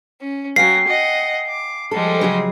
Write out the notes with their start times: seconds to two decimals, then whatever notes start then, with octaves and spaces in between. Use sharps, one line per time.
0.21 C#4
0.56 F#3 F5 G5 G#5 A#6 C7
0.87 D#5 F#5
1.48 D6
1.91 F3 G3 G#3 A4
2.21 C#3 F#3 G#4